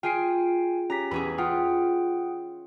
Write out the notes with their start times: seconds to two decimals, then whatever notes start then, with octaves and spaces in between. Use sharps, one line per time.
0.03 F4 G#4 G5 G#5 C7 D7
0.90 C#4 G4 A#5 B6
1.11 E2 C#4 G#4 B5
1.38 F4 F#5 G5 D#6